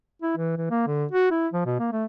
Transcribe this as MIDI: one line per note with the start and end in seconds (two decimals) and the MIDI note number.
0.22 0.34 64
0.37 0.54 52
0.57 0.70 52
0.71 0.83 58
0.87 1.05 50
1.11 1.30 66
1.31 1.48 64
1.53 1.63 53
1.66 1.77 47
1.79 1.88 58
1.92 2.05 57